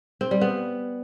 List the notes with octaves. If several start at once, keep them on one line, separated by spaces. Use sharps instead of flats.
C4
G3
B3